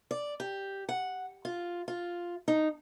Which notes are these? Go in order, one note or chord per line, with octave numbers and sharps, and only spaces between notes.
D5
G4
F#5
F4
F4
D#4